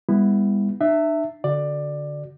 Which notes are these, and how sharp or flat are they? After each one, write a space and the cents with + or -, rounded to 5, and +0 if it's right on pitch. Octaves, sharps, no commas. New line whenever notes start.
G3 +45 B3 +0 E4 +0
D4 +45 E5 +0
D3 -15 F#4 -5 D5 +15